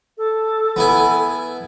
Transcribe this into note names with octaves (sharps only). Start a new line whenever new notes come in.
A4
B3 E4 G#5